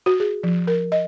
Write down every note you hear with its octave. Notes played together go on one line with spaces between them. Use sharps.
F#4
G#4
F3
A#4
D#5